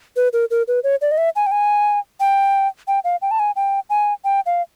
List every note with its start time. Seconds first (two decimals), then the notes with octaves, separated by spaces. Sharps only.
0.16 B4
0.33 A#4
0.51 A#4
0.68 B4
0.84 C#5
1.01 D5
1.11 D#5
1.18 E5
1.36 G#5
1.47 G5
1.52 G#5
2.20 G5
2.88 G5
3.04 F5
3.22 G5
3.31 A5
3.39 G#5
3.56 G5
3.90 G#5
4.24 G5
4.46 F5